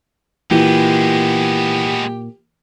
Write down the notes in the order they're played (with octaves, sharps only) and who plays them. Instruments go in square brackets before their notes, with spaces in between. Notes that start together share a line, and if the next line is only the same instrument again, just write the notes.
[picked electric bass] A#2 [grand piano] E3 [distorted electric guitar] G#3 B3 [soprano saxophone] G4